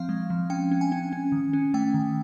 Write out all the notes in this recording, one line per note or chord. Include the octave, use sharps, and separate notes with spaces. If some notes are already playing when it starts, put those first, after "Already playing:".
Already playing: F3 C4 F5
G#3
F3
C#4 G5
C#4
G#5
C#4
C#4
D#3
C#4
A3 G5
D#3